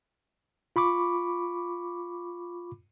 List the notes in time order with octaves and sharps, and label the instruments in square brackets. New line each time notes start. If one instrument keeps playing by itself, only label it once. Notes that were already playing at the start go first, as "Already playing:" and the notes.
[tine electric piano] F4 B5 C#6 D6